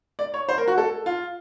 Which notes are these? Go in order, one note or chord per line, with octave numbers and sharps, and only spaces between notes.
D5
C#5
C5
A#4
F#4
A4
F4